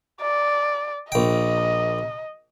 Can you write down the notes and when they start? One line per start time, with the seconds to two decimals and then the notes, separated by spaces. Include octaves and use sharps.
0.21 D5
1.12 A#1 D#5 G5